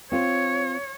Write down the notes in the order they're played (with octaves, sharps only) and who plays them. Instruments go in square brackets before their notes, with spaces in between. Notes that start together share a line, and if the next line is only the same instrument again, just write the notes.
[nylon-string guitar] C4 F4 C5 [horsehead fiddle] C#5